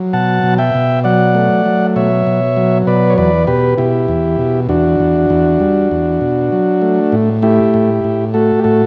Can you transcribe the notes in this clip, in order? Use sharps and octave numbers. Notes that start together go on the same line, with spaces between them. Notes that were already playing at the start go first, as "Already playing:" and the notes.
Already playing: F#3
B2 F#5 A5
B2
E5 G5
B2
F#3 D5 F#5
A3
F#3
B2 C#5 E5
B2
F#3
B2 B4 D5
C#5
E2 B4 D5
B2 G4 B4
B2 E4 G4
E2
B2
E2 D4 F#4
E2
E2
G3
E2
B2
F#3
A3
A2
A3 E4 G4
A2
A2
A3 F#4 A4
G4
A2 F#4 A4